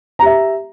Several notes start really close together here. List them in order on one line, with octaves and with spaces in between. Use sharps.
A#5 G4 E5